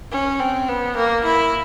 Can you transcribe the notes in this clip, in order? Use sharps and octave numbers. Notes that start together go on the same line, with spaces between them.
C#4
C4
B3
A#3
E4